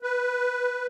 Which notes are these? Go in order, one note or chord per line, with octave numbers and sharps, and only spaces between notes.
B4